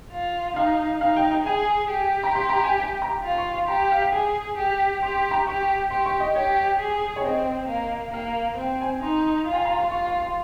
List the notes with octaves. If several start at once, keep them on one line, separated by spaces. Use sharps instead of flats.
F4
D#4 F5
D#4 F5
G5
G5
G#4 G#5
G4
A#5
C6
A#5
G#5
G5
A#5
F4
C6
C#6
C6
G4 A#5
F5
G5
G#4 G#5
G4
G4 C6
C6
A#5
G4 C#6
G4 C6
C#6
D#5
G4 C#5
G#4
C#5
C4 D#5
A#3
A#3 F5
C4 G5
G#5
D#4 C6
F4
G#5
A#5
C6
F4 C#6
C6
C6